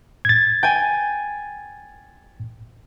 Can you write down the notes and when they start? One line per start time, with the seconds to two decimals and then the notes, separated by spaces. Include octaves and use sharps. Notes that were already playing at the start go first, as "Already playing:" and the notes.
0.25 G#6 A6
0.63 G5 G#5